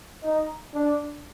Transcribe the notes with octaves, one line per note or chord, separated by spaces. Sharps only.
D#4
D4